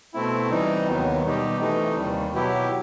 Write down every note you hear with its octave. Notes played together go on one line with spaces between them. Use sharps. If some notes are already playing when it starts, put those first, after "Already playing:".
B2 A3 C4 E4
C3 E3 G3 D#4
D#2 D#3 F#3 B3
B2 G3 D#4 G4
C3 E3 A3 D#4
D#2 D#3 G3
B2 F#3 B3 E4 G4